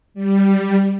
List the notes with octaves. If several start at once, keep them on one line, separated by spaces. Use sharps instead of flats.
G3